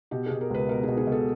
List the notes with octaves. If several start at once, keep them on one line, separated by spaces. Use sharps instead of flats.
B2 G4
B2 G#4
A#4
C#2 B4
B2 A#4
B2 G#4
G#4
B2 A4